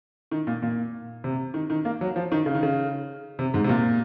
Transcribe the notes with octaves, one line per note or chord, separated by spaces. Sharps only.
D#3
A#2
A#2
C3
D#3
D#3
A#3
F#3
F3
D#3
C#3
D#3
C#3
C3
G#2
C3
A#2